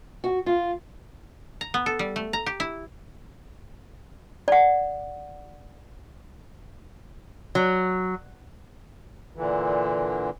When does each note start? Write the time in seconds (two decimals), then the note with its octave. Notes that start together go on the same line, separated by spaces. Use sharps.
0.24 F#4
0.46 F4
1.61 A#5
1.74 B3
1.86 A4
1.99 G3
2.16 A3
2.33 A#5
2.46 G4
2.60 E4
4.48 D5 F#5
7.55 F#3
9.36 A#2 D3 E3